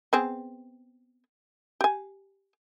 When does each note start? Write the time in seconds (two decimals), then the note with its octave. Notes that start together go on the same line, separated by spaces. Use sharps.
0.13 B3 C4 G#4
1.81 G4 G#5